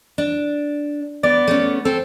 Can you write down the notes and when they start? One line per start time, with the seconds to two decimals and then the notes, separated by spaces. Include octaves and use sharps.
0.18 D4
1.23 B3 D5
1.48 A3 B3 C#4
1.85 C4 A4